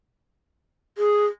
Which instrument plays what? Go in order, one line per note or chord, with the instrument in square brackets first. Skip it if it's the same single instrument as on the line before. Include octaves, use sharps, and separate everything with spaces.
[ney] G#4